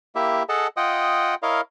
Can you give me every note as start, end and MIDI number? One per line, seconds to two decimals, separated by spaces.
0.15 0.43 58
0.15 0.43 64
0.15 0.43 67
0.15 0.43 76
0.49 0.67 68
0.49 0.67 69
0.49 0.67 75
0.49 0.67 78
0.49 0.67 81
0.77 1.35 65
0.77 1.35 75
0.77 1.35 78
0.77 1.35 79
0.77 1.35 87
1.43 1.61 64
1.43 1.61 70
1.43 1.61 73
1.43 1.61 75
1.43 1.61 77